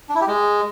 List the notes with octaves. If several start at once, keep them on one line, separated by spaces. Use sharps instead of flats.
D4
E4
G4
G#3